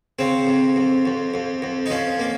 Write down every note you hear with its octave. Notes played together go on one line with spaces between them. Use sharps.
C#3 C4
F2
F2
F2
F2
F2
D#4
F3 C#4
A#3